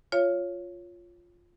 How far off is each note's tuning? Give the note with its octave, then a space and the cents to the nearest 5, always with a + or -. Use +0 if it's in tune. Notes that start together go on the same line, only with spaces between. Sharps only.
F4 +0 C#5 +0 F5 -40